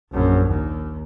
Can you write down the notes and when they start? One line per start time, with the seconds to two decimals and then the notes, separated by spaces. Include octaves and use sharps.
0.12 A#1 F#2
0.48 D#2